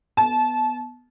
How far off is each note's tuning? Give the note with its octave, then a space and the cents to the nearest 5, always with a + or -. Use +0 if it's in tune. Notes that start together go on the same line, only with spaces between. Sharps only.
B3 +0 A5 -25